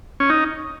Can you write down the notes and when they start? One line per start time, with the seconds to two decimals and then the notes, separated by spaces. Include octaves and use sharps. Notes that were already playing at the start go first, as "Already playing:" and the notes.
0.20 C#4
0.30 D#4